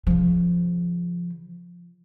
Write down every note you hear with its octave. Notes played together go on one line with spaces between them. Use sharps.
C#3 F3